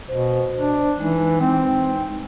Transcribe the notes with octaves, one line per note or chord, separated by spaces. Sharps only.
B2 C5
D4
E3 G#3 D#4
C4